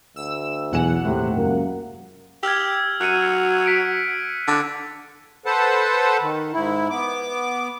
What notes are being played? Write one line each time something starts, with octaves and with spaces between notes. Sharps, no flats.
D2 E6
B1 E2 F#5 G#5 E7
D#2 A2 C3 A3
C#2 F#2 A#3
G4 E6 F6 G#6
F#3 F#6 C#7 D#7
B6 C#7 D7
D3
A4 B4 C5 F#5 A5
D#3
G#2 E4
B3 D6